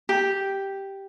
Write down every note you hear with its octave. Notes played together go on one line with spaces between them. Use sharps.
G4